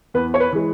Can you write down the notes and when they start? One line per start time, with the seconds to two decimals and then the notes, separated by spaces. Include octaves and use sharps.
0.14 E2 B4
0.34 C#5
0.40 B4
0.52 E3 G#3